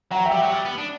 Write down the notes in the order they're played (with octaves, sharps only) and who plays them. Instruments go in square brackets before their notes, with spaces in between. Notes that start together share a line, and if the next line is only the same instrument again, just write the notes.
[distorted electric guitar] F#3 [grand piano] F#5 A#5
[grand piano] E5 G5
[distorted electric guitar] G3
[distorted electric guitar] F#3 [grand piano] E5 G5
[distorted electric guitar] G3
B3
D4